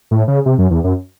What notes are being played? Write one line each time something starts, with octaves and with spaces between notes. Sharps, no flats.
A2
C#3
C3
F#2
E2
F#2